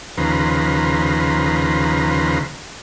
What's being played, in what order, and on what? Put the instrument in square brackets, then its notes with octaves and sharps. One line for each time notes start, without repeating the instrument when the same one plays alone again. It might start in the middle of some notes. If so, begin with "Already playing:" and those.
[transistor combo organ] D#2 C#3 F3 B4 A#5 C6